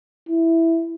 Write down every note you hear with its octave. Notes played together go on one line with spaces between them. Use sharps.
E4